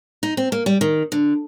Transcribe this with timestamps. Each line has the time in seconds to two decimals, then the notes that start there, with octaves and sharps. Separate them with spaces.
0.23 D#4
0.37 C4
0.52 A#3
0.66 G3
0.81 D#3
1.12 D3